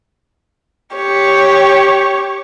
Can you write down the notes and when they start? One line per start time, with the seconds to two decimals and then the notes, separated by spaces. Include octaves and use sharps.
0.95 G4 C#5